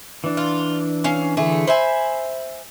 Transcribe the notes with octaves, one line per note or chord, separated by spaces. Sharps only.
E3 D4
F4
C#4 F5
D3 E3 A3 G#4
C5 E5 G#5 B5